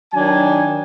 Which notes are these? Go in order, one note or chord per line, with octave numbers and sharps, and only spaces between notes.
D#3 F#3 D4 G#5